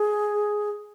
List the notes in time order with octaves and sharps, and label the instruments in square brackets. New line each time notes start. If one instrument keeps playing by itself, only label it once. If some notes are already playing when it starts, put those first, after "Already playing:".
Already playing: [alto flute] G#4